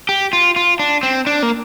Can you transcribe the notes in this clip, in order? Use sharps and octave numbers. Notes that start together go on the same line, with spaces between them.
G4
F4
F4
D4
C4
D4
A#3